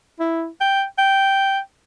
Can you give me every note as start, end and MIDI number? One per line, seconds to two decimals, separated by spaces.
0.20 0.47 64
0.61 0.83 79
0.98 1.59 79